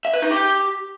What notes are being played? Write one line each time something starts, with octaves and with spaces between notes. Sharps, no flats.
E5
B4
D#4
G4